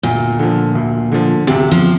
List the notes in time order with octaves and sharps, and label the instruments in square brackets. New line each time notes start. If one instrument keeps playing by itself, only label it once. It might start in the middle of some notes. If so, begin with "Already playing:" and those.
[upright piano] D2 [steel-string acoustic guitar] A#2
[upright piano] D3 F3
D2
D3 F3
[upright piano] D2 [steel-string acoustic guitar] C3
[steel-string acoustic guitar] F3